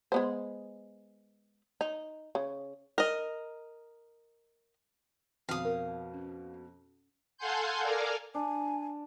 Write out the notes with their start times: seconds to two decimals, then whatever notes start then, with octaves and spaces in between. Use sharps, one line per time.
0.12 G#3 B3 C5
1.81 D#4
2.35 C#3
2.98 A#4 D#5
5.49 F2 B2 F5 D#6
5.65 A#4
6.14 C#4
7.37 A4 F5 F#5 G#5 C6 G6
7.81 A4 A#4 D5 F5 G#5 A#5
8.35 D4 G#5